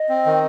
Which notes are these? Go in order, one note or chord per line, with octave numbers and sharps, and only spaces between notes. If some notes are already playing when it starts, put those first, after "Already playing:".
Already playing: D#5
C4
D#3